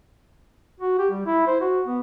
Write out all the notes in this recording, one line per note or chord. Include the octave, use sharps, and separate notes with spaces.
F#4
G4
G3
E4
C5
F#4
B3